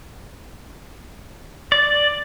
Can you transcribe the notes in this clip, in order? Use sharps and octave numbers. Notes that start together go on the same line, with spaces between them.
D5